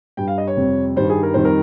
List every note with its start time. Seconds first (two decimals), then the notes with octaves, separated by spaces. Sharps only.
0.17 G2 G3 G5
0.28 F5
0.38 D#5
0.48 C#5
0.57 F2 C3 G3
0.96 G2 D#3 G3 C5
1.10 G#4
1.23 A#4
1.34 F2 D#3 G3 C5
1.45 A#4